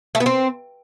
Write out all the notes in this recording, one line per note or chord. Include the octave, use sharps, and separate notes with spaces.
A3
B3
C4